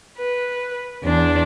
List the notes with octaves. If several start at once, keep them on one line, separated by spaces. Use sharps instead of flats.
B4
E2 D4